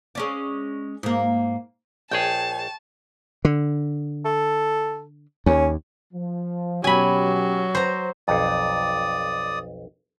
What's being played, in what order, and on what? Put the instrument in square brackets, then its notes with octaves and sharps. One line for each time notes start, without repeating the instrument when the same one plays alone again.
[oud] G#3 C#4 D5
G#2 A#3
[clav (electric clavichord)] A#1 G#4 [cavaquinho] C#5 G5 [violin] A5
[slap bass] D3
[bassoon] A4
[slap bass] D#2 [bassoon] C#4
[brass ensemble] F3
[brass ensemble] B2 C#4 G4 [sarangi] F#3 [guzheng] G#5 B5
[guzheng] C5 A#5
[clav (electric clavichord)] B1 F2 [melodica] D5 D#6